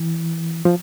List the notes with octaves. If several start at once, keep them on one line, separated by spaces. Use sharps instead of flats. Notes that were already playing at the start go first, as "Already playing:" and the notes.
Already playing: E3
F3